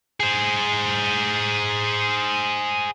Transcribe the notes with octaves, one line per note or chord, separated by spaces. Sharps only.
G#4 C5